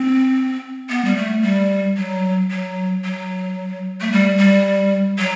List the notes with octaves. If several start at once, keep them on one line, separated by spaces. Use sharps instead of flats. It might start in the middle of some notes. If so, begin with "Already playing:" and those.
Already playing: C4
B3
G3
A3
G3
F#3
F#3
F#3
A3
G3
G3
F#3